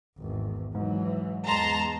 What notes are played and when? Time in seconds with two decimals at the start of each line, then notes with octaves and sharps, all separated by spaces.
0.19 G#1 E2
0.75 G#2 E3 F#3
1.46 E2 G#3 A5 A#5 C6